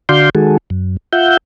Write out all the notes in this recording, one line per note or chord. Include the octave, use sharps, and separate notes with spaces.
D3 F#4 D5 F5 C6 G6
D#3 G#3 F#4 G#4 A4
F#2
F4 E5 F#5 G6